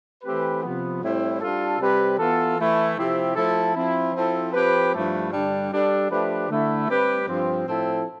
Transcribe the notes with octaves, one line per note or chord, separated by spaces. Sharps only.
E3 A3 C4 G4 B4
C3 F3 B3
A2 G3 C4 E4
G3 D4 F4 A4
C3 G3 C4 G4 B4
E3 B3 F4 A4
E3 A3 E4
C3 F3 C4 E4 G4
F3 A3 E4 A4
F3 C4 E4
F3 C4 E4 A4
F3 C4 G4 B4
G2 F3 A3 E4 A4
G2 D3 G3 D4
G3 D4 A4
F3 A3 D4 G4 B4
D3 A3 E4
G3 C4 G4 B4
G2 F3 C4
A2 F3 C4 E4 A4